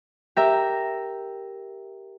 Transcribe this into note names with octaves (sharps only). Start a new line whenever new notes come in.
G4 A#4 E5